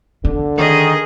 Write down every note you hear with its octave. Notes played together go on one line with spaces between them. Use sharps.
D3 D4
D#3 G#4 D#5